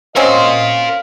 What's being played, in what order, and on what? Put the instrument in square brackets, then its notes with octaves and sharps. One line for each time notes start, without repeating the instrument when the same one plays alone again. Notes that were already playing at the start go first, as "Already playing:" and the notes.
[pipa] F#3 C4 C#4 [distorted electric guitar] A#4 C6 [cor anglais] D#5 [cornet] F5